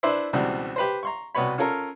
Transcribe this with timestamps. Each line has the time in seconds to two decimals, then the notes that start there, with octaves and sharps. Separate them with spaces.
0.03 D4 E4 B4 C5 D5 E5
0.33 C#2 B2 E3 G3 C4
0.76 G4 B4 C5
1.03 A#5 C6 C#6
1.35 C2 B2 B4 C#5 B5
1.58 C#4 F4 A4 A#4